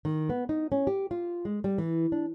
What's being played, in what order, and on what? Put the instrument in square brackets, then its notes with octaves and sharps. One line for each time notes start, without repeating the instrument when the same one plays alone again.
[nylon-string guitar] D#3
B3
D#4
C#4
G4
F4
G#3
G3
E3
D4